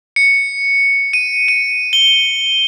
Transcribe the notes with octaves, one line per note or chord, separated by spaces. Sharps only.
C#7
D#7
D#7
G7